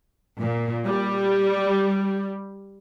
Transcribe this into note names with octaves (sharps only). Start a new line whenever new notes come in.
A#2
G3